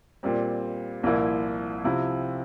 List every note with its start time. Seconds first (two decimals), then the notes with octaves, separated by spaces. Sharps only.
0.23 A#2 G3 C4
1.03 C2 A#2 F3 A#3 E4
1.84 C3 F3 C4 E4